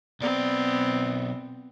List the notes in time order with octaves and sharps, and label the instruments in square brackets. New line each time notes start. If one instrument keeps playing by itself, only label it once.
[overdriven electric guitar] B1 D5 [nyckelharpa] B3 C4